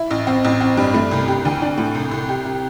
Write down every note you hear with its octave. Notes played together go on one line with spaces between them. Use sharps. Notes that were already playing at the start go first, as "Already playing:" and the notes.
Already playing: E4
A1
C4
A1
C4
G2
A3
C2
G4
D2
D4
A2
C2
C2
G4
C3